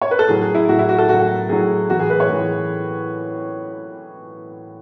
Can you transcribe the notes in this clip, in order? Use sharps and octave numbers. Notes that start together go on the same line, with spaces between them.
C#5
B4
A4
A2 F#3 G#4
G#4
E4
A2 F#3 F#4
E4
F#4
A4
A2 F#3 F#4
F#4
A2 F#3 G#4
A2 E3 F#4
G#4
B4
C#5
A2 E3 G#4